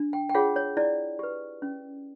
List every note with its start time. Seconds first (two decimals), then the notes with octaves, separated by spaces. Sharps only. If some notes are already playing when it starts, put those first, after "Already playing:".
Already playing: D4
0.13 G5
0.29 G5
0.35 F4 G#4 C#5 F#5
0.56 C#5
0.77 E4 D5
1.19 G4 B4
1.62 C#4